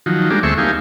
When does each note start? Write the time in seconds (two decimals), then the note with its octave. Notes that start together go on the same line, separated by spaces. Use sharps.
0.06 D#3 F3 F#3
0.30 G3 G#3 A#3 D4
0.43 D2 A3 C4 G#4 E5 C#6
0.58 A#3 D#4 G4 F5 G#5